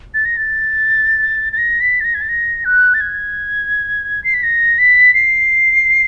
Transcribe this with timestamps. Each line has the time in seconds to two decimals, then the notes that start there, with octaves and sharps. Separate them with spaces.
0.14 A6
0.25 A#6
0.37 A6
1.53 A6
1.58 A#6
1.81 B6
2.00 A6
2.05 A#6
2.15 G#6
2.21 A6
2.29 A#6
2.65 F#6
2.94 A6
3.01 G#6
4.24 C7
4.34 B6
4.43 A#6
4.78 B6
5.14 C7